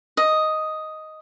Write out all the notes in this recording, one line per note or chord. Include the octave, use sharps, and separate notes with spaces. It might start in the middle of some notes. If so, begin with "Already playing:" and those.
D#5